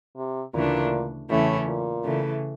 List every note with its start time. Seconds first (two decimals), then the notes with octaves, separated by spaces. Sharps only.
0.17 C3
0.54 D2 A#2 C#3 E3 A3 D4
1.30 E2 A2 C#3 E3 A3 C#4
1.67 A#2
2.04 C#3 E3 A3